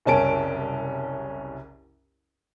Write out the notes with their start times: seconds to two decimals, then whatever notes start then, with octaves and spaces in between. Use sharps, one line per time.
0.05 F#1 C2 C#4 A5 D7